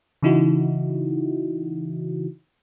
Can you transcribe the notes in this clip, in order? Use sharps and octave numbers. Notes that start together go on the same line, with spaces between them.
C#3 E3 D#4 E4 F#4